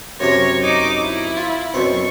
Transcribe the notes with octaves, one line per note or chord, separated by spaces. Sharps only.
F#2 C3 C#4 C#5 A#6
D#4 D6
E4
F4
F#2 B2 C4 C#6